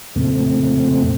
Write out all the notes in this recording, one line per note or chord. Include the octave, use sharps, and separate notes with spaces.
F2 A#2 C#3 A3 C4